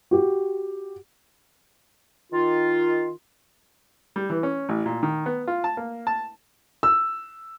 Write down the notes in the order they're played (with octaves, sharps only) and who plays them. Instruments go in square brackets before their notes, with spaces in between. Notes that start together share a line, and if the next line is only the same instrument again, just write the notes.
[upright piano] F#4 G4
[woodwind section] D#3 F4
[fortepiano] G3
E3
C#4
A1
A#2
D#3
B3
F4
A5
A#3
A5
[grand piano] E6